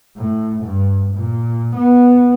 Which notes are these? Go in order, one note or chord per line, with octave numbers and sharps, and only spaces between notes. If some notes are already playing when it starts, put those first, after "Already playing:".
A2
G2
A#2
B3